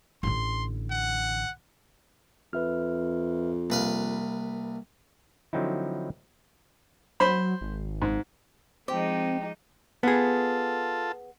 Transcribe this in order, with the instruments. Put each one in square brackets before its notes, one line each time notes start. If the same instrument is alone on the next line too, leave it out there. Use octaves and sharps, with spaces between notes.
[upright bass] A1 D3 [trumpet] C6
[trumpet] F#5
[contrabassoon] F2 [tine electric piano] B4 E5 F6
[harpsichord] C2 B4 F5 [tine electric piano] A#3
[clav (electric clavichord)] D3 F3 F#3 C4 D#4 E4
[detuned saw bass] F#3 [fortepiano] C5 B5
[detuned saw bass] G#1
[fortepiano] G#2
[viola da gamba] F3 G#3 D#4 [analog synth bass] C4 [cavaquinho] G4
[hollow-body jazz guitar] B3 G#4 [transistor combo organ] F4 A4 A5